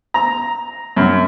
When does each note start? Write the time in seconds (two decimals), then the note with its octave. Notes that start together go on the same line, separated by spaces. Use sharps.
0.14 A#5
0.96 F#2